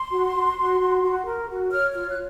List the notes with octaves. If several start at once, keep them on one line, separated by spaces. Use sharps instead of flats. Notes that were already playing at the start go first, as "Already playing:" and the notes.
Already playing: C6
F#4
F#4
F#4
F#4
F#4
A#4
F#4
C#5 F6
F4 F6
F#6